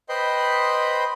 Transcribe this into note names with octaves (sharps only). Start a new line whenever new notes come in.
B4 C5 D#5 G5 B5 C6